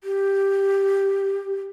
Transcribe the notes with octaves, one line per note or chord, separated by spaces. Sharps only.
G4